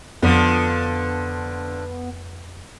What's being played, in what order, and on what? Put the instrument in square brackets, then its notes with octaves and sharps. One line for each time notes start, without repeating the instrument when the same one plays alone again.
[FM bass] F2 [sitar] D3 F3 [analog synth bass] B3